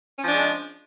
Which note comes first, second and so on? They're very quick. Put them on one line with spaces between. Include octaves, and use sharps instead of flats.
C#4 F3 D4 G#3